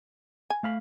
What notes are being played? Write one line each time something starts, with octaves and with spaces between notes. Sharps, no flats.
G#5
A3 F5 B5